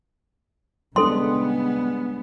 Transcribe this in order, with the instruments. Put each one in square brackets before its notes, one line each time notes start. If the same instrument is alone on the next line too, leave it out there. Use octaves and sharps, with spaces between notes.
[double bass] C#3 B3 [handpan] G3 G#3 D4 [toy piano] A4 C6